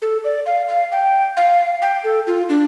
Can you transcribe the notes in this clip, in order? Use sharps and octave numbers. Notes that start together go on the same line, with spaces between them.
A4
D5
F5
F5
G5
F5
G5
A4
F4
D4